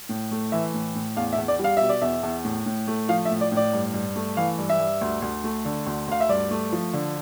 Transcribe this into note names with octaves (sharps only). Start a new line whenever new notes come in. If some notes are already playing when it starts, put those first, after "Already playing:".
A2
A3
E3 E5
A2
A2
E2 F5
E5
E2
D5
G3
F5
B2 E5
D5
E2 E5
E2
A2
A2
A3
F3 F5
E5
A2
D5
A2
D5
G2
G2
A3
E3 F5
G2
E5
G2
D2
D2
A3
D3
D2
D2 F5
E5
G2 D5
A3
F3
D3